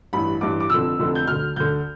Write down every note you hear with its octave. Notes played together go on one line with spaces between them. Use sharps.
A1 G2 E3 B5
A1 G2 E3 D6
D6
F1 F2 D3 E6
F1 F2 D3
G6
D2 D3 F6
D2 D3 G6